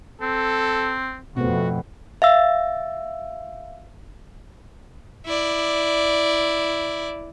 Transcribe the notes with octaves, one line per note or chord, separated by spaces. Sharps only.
C4 A4
F2 B2 A3 B3 C4 F#4
E5 F5 E6
E4 D5